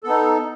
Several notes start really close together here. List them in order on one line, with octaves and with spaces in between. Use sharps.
A4 B3 D#4